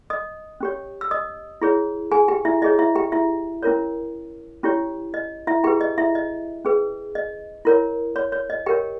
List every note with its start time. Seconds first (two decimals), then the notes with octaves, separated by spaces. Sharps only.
0.10 D#5 D#6
0.60 C#4 G4 C#5
1.01 E6
1.11 D#5 D#6
1.61 E4 G#4 C#5
2.12 G#4 G#5
2.28 G4 G5
2.45 E4 E5
2.62 E4 G#4 C#5 D#5
2.79 E4 E5
2.96 G4 G5
3.12 E4 E5
3.63 C#4 E4 A#4 C#5
4.63 C#4 E4 G4 C#5
5.14 D#5
5.47 E4 E5
5.64 E4 G4 G#4 B4 G5
5.81 D#5
5.98 E4 E5
6.15 D#5
6.65 C#4 G#4 B4
7.15 D#5
7.65 E4 A#4 C#5
8.16 C#5
8.32 C#5
8.50 D#5
8.66 G4 A#4 C#5 G5